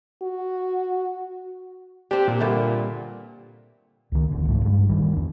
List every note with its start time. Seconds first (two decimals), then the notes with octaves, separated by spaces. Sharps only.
0.22 F#4
2.11 C4 D4 G4
2.28 A#2
2.40 G2 D3 E5
4.12 C#2 D#3
4.31 E1 D2 D3
4.48 C#2 G#2 F3 A3
4.65 G2 G#3
4.89 A1 D#3 G3
5.16 E2 D4